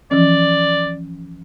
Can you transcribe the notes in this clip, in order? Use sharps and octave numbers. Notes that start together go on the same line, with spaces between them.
E3 F3 C#4 D5